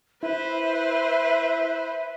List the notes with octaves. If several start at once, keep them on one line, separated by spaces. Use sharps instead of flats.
E4 B4 C5 E5